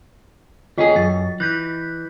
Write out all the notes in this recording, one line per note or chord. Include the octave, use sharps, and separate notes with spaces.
D#2 C#4 F4 G#4 D#5
F#2 A6
E3 F#6 G6 B6